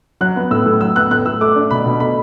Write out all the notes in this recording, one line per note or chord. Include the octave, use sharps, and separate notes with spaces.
F#3 F#6
B3
A2 E6
A2
F#3 E6
B3 F#6
A2 F#6
A2 E6
A3 D6
D4
B2 B5
B2
A3 B5